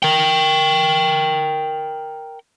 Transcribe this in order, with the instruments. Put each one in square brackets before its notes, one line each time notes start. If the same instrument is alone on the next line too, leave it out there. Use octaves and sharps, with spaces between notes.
[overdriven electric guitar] A#4 G5